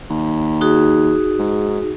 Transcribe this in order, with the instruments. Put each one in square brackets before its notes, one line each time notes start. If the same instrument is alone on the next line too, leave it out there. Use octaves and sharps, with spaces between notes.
[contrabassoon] D#2
[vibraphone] D#4 F#4 G#4
[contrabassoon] G#2